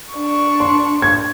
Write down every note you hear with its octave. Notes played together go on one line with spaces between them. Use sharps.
D4 C#6
C6
G#6